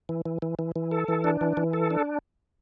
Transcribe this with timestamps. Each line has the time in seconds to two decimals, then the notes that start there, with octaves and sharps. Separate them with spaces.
0.09 E3
0.26 E3
0.42 E3
0.59 E3
0.76 E3
0.91 A4
1.08 E3
1.24 D4
1.41 E3
1.57 E3
1.73 A4
1.91 D4